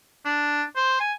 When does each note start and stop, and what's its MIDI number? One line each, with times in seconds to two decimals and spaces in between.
0.25 0.63 62
0.76 0.98 72
1.00 1.12 80